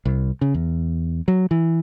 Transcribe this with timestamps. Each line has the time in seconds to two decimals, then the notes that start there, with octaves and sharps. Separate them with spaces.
0.05 C2
0.41 C#3
0.54 E2
1.28 F#3
1.51 E3